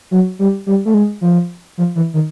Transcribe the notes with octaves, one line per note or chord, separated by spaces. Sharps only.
F#3
G3
G3
A3
G#3
F3
F3
E3
D#3